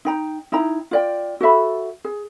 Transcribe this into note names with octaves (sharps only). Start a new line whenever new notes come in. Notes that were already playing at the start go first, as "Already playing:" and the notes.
D#4 G5 A#5
D#4 E4 G5 A#5
F4 D5 G5
F#4 A4 E5 B5
G#4